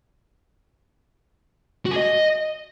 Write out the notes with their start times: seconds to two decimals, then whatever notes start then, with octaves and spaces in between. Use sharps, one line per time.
1.86 F#4
1.91 G#4
1.96 D#5